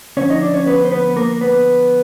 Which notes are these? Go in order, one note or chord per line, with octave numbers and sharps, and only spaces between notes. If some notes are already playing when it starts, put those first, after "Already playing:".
D2 D3 F3 C#4 C#5
D#4 D#5
D4 D5
C#4 C#5
B3 B4
C5
B3 B4
A#3 A#4
B3 B4